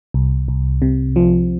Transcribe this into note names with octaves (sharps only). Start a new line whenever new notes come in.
C2
C2
C3
F3